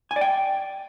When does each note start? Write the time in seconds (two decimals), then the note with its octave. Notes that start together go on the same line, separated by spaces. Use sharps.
0.11 G#5
0.16 D5
0.21 G5